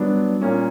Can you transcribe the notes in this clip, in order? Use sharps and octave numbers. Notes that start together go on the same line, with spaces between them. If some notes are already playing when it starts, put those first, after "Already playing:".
Already playing: F#3 G3 B3 D4
A#2 A#3 C#4